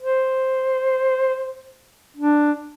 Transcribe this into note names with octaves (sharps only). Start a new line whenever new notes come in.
C5
D4